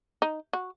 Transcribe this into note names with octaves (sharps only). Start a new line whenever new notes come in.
D#4
F#4